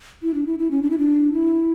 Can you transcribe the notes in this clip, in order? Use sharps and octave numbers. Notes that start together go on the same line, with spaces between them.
E4
D4
E4
E4
C#4
D4
E4
D4
E4